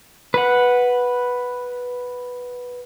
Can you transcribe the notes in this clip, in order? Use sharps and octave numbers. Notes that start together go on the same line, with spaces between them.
B4 F#5